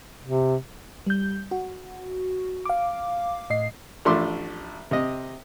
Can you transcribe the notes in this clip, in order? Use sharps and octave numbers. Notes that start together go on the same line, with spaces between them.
C3
G3 G6
F#4
F5 D6
A2 D#5 C7
A1 F3 A3 D4 C6 D6
C3 D#5